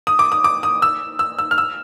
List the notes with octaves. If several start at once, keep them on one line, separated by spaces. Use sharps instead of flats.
D#6
D6
D#6
D6
D#6
E6
E6
E6
F6
E6